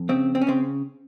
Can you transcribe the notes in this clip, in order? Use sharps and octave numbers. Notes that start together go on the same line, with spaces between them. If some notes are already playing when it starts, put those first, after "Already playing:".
Already playing: F2
C#3 C4
C4
C#4
C#3 C4